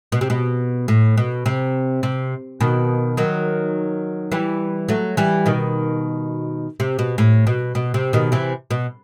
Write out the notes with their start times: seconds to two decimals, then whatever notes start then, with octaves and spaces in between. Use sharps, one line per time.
0.12 B2
0.21 C3
0.30 B2
0.88 A2
1.17 B2
1.46 C3
2.03 C3
2.61 B2 D#3
3.17 D#3 F#3
4.32 E3 G3
4.89 F#3 A3
5.17 E3 G3
5.46 B2 D#3
6.80 C3
6.99 B2
7.18 A2
7.47 B2
7.75 B2
7.94 C3
8.13 B2 D#3
8.32 C3 E3
8.71 B2